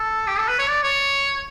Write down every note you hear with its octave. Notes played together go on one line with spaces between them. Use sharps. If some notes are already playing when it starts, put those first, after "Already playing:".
Already playing: A4
G4
A4
B4
C#5
D5
C#5